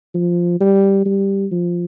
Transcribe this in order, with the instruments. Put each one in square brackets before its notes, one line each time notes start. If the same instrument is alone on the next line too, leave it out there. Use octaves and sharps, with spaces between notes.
[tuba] F3
G3
G3
F3